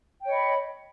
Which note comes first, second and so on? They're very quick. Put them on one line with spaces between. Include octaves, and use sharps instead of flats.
G5 C#5 D#5 B5